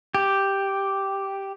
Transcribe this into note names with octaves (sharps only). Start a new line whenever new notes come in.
G4